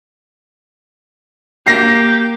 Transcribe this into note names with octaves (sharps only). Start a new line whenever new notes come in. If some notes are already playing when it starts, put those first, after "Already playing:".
A#3 G4 A#6 C7